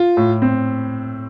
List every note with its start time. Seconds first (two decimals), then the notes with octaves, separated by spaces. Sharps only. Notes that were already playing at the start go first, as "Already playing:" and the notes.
Already playing: F4
0.17 A2
0.42 C4